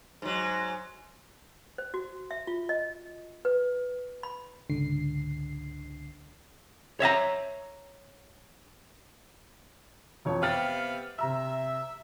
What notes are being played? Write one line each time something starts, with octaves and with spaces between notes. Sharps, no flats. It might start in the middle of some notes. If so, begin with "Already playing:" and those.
G#2 F#3
C5
F#4
E5
F4
D#5
B4
B5
G#1 C#2 D3 C7
C#5 E5 F5 A#5
E1 F2 C#5
C3 B3 F5 G5 F6 A6
C3 E5 A#5 E6